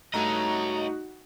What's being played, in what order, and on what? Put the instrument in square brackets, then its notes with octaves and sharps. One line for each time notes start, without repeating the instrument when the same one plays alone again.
[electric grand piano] G2 A3 [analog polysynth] D#4 F#4 [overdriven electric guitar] C#5 D#5 [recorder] A#5